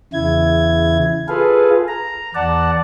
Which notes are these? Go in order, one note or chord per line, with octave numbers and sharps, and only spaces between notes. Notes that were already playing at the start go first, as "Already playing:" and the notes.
E2 C#3 E4 G#6
F4 G#4 A4 B4 F5
A#5
E2 D5 F#5 A5